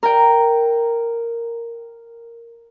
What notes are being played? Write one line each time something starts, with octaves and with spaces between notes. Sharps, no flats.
A#4 G5